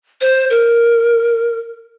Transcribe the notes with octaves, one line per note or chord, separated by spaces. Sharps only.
C5
A#4